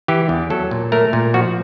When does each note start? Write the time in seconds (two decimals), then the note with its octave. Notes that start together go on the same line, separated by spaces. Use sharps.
0.08 E3 G4
0.29 E2
0.50 F#3 A4
0.71 A#2
0.92 A3 A#4
1.13 A#2
1.34 F3 F#4